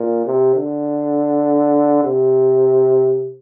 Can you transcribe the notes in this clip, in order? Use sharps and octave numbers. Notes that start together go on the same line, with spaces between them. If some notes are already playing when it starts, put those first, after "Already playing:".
Already playing: A#2
C3
D3
C3